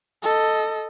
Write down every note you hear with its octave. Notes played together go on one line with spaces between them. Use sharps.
A4 D#5